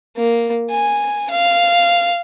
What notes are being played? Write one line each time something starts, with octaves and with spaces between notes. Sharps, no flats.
A#3
G#5
F5